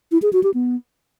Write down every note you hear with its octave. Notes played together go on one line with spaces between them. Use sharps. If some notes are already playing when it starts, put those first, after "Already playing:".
E4
G#4
F#4
G4
B3